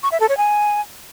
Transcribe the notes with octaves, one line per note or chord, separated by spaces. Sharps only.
C#6
E5
A4
C#5
G#5